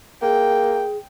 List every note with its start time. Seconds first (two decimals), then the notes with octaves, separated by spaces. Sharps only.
0.22 A#3 G#4 G5